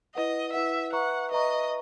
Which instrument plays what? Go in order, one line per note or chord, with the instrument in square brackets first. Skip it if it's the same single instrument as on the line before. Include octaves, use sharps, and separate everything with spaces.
[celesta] E4 B4 F#5 [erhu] D#5
[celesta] E4 B4 F#5 [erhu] E5
[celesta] B4 E5 A#5 C#6 [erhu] F#5
[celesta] B4 E5 A#5 C#6 [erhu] D#5